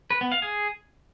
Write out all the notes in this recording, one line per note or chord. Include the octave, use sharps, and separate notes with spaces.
B4
B3
F5
G#4